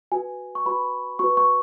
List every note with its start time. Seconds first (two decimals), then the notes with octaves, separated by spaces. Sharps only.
0.12 F#4 B4 G#5
0.55 C#6
0.66 F#4 B4 B5
1.19 F#4 B4 C#6
1.37 C#6